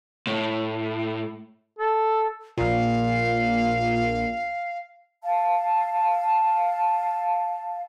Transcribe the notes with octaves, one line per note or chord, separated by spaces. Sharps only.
A2
A4
A#1 A#2 F5
F5 A5